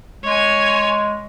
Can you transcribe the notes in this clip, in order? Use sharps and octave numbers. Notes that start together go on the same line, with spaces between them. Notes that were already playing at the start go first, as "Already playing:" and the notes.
G#3 C#5 G#5